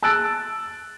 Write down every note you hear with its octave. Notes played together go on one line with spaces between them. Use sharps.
A5 E6 F#6 A6 D7